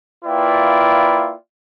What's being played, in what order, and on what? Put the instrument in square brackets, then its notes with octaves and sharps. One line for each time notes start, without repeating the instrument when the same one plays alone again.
[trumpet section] A#3 E4 F4 B4 D5 G5